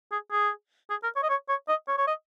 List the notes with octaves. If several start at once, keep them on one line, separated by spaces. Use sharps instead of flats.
G#4
G#4
G#4
A#4
C#5
D#5
C#5
C#5
D#5
C#5
C#5
D#5